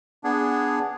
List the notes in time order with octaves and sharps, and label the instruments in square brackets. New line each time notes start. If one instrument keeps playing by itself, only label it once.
[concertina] B3 D4 G#4